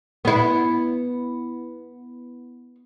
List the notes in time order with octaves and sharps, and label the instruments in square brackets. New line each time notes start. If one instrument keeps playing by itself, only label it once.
[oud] B3 E4